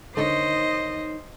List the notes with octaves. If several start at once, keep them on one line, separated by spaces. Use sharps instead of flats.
D#2 D3 D#4 C5 C#5 D#5